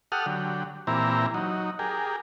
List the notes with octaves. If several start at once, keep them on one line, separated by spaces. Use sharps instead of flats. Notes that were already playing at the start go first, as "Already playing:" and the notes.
G4 A4 F#5 D#6 F6
D3 F#3 G4
A#2 E3 C4 E4 G4 A#5
F#3 D#4
G4 G#4 A#4